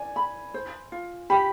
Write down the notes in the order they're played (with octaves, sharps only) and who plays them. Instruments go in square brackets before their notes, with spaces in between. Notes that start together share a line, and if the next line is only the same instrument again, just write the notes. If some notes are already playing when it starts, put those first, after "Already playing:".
Already playing: [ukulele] D5 [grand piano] G#5
[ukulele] B5
C5
F4
[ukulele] G4 [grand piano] B5